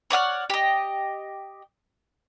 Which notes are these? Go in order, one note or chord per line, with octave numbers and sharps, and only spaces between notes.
C#5 D5 F#5 F6
G4 D#5